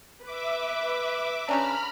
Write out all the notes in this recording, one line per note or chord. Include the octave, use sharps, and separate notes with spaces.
B4 E5 D6
C#3 C#4 D4 A#5 B5 F6